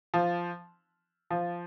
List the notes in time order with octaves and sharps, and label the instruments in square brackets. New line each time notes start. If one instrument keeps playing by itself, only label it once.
[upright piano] F3
F3